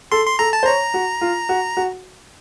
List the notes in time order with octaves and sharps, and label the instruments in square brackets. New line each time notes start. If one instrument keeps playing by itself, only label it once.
[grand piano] A4 [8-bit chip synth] C6
[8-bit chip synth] C6
[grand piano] A4 [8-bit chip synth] A#5
[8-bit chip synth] A5
[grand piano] C5
[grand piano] C#5 [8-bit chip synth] A#5
[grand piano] F#4
F4
F#4
F#4